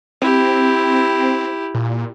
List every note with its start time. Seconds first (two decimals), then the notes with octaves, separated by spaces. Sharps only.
0.22 C4 E4 G4
1.74 A#2